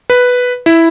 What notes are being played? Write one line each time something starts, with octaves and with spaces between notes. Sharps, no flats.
B4
E4